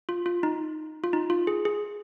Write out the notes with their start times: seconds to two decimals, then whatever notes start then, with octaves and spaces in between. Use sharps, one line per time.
0.09 F4
0.26 F4
0.43 D#4
1.04 F4
1.13 D#4
1.30 F4
1.47 G#4
1.65 G#4